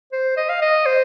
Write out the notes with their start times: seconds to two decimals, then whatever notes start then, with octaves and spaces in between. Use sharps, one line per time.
0.12 C5
0.37 D#5
0.49 F5
0.62 D#5
0.86 C5